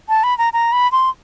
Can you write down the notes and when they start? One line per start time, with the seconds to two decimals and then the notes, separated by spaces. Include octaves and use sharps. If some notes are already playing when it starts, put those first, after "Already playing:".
0.09 A5
0.24 B5
0.38 A#5
0.53 A#5
0.72 B5
0.92 C6